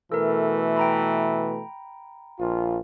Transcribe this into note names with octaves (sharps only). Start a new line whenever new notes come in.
B2 E3 A3 A4 A#4
G5 A#5 B5
A#1 F4